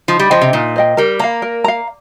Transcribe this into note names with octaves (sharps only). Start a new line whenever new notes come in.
F3 D#4
G3
F3 C5 D#5 G5
C3
A#2 D#4
C5 D#5 G5
G3 A#4
A#3 F5 A#5
A#4
F5 A#5